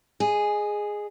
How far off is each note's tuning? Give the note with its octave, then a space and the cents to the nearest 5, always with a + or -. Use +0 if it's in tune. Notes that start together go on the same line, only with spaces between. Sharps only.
G#4 +0 D#5 -20